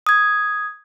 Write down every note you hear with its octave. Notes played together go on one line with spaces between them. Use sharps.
D#6 G#6